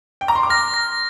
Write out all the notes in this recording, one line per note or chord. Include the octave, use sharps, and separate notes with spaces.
G5
A#5
C6
D6
F6 A#6
A#6